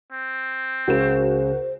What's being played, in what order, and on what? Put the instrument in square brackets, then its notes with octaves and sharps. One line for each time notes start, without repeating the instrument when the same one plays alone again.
[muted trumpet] C4
[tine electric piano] C#2 C#3 [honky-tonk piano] F#4 A#4 E7 [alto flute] C5